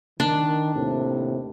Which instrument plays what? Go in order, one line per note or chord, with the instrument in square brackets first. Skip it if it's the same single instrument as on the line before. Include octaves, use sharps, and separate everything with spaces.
[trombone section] D#3 [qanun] D4
[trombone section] D#2 A2 C3